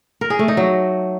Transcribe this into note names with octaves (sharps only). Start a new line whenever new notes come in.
A#4
G#4
A3
D#4
F#3